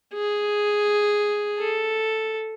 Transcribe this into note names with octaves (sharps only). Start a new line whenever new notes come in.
G#4
A4